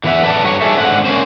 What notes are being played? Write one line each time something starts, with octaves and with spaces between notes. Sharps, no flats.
D3 E3 B3 C5 E5 F#5
A4 B4 D5 A5
G2 F#3 C#5
G3 D4 D#4 G#4 A4 E5
G#2 D3 C4 F#5
A#3 C#4 C5